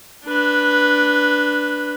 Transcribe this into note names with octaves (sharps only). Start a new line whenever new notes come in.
D4 B4